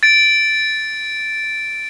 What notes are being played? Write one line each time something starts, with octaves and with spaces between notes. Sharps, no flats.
A6 D7